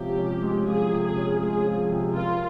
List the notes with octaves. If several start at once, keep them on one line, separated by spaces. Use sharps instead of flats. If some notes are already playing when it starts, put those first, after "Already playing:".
Already playing: C3 F3 G#3 C#4 G4
C#4
G#3
F3 G#4
C3
G#4
C#4
G#3 G#4
F3
C3
F4 A#4